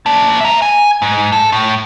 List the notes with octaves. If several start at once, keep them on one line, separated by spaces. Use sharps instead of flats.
A#3 A5
E5 A#5
G#5
G#2
A4
A2